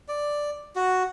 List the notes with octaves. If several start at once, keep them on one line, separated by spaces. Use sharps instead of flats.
D5
F#4